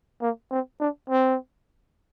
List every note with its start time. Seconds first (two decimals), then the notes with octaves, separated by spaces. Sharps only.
0.22 A#3
0.51 C4
0.80 D4
1.10 C4